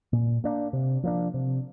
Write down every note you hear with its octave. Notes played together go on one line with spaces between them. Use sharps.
A#2
A#3 D4
C3
F3 A#3 D4
C3